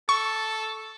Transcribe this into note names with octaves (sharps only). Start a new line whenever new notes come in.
A4 C#6